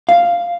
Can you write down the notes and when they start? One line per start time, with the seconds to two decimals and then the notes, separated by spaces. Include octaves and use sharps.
0.09 F5